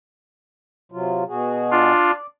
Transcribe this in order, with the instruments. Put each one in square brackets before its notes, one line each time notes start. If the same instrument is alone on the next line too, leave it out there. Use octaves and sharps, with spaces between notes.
[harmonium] C3 F#3 F4
B2 F#4 G#4
[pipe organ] D4 F4
[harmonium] D5